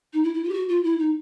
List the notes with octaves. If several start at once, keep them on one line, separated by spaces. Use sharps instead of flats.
D#4
E4
E4
F4
G4
F#4
F4
E4
D#4